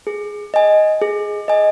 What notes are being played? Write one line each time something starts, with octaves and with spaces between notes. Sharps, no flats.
G#4
D#5 G#5
G#4
D#5 G#5